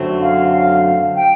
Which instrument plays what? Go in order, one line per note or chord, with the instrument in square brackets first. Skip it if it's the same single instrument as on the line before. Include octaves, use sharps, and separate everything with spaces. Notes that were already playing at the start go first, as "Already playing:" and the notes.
Already playing: [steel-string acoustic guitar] F#2 D3 F#3 A3 C4
[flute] F5
F5
G5